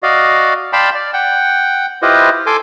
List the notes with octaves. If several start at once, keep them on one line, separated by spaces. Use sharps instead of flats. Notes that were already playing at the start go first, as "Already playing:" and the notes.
F#4 D5 D#5 F5
D5 F5 G5 A5 B5 C6
D5
F#5 G5
E4 F4 G4 B4 C5 D#5
A4 G#5 C6 D6